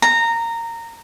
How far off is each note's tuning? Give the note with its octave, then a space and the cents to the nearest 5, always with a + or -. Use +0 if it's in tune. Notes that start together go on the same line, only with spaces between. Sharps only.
A#5 -15